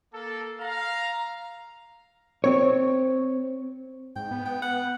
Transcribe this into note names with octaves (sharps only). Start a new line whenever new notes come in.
A#3 A4
F5 A#5
C4 C#5
G#2 G5
B3
G5
F#5